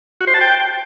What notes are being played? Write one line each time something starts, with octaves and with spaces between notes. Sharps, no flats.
F#4
C5
A5
G5